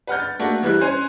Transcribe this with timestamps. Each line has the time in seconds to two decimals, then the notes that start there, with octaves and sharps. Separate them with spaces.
0.07 B4 F#5 F6 G6
0.19 A6
0.39 A3 A#3 D4 F#4
0.63 E3 G3 E4 F#6
0.81 C#4 C5 G#5